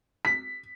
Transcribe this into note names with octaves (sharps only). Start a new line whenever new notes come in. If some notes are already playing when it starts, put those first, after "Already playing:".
B6